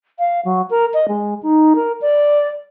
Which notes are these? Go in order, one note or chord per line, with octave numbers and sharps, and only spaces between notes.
F5
F#3
A#4
D#5
G#3
D#4
A#4
D5